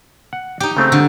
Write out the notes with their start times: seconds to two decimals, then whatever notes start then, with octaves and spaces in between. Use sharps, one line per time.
0.33 F#5
0.60 D#4 G4 G5
0.77 C#3 A3 C4
0.92 D3